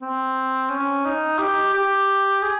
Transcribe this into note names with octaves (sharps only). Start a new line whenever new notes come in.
C4
C#4
D#4
G4
G4
G#4